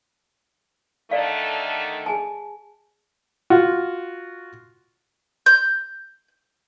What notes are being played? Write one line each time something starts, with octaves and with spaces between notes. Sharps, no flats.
D3 D#3 A3 D5 F5
G#4 G#5 A5
F4 F#4
G6